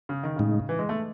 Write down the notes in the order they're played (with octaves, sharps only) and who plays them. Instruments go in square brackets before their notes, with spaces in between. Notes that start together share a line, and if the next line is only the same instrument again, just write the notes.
[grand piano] C#3
D#3
[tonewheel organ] A2 G#3 D#4 [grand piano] C#3
[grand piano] E3
G#3
A3